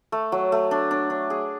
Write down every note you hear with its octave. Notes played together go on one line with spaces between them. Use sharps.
A3
F#3
A3
D4
D4
D4
G#4